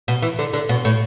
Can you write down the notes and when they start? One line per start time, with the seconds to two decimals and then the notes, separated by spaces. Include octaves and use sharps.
0.08 B2
0.22 E3
0.39 D3
0.53 D3
0.69 B2
0.85 A2